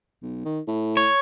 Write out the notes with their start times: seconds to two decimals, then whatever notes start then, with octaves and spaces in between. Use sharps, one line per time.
0.22 B1
0.45 D#3
0.67 A2
0.97 C#5